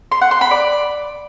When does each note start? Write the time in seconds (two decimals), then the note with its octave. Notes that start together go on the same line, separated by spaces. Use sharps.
0.12 C6
0.21 F#5
0.31 C6
0.41 B5
0.51 D5